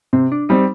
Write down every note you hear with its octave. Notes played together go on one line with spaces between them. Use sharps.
C3 C4
D4
G3 C4 D#4